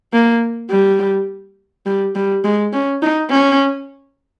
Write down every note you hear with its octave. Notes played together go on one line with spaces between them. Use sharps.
A#3
G3
G3
G3
G#3
C#4
D#4
C#4